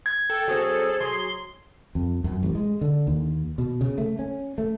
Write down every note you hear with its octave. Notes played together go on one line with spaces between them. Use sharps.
G#6
A4 G5
F#3 C4 F#4 G#4
F#3 C6
F2
F#2
A1
G#3
D3
D#2
B2
C#3
A3
C#4
A3